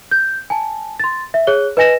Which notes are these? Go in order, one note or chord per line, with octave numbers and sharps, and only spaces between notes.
G6
G#5 A5
C6 A6
E5
G#4 C#5 F#6 G7
B4 D#5 G#5 A#6 E7